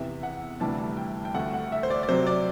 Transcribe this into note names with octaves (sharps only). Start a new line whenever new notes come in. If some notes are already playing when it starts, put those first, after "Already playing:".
Already playing: E2 C3 E3 B3 E5
F#5
D2 C3 E3 G3 D4 A5
G5
G5
D2 D3 A3 F#5
F#5
E5
C5
D5
D5
C3 F#3 C4 C5
D5